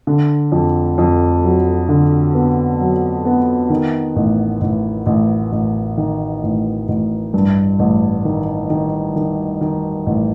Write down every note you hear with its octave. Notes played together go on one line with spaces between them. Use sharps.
D3
F2
F2
F#3
D3
B3
F#3
B3
D#3
A1
A1
A1
A1
D#3
A1
A1
G2
A1
D#3
D#3
D#3
D#3
A1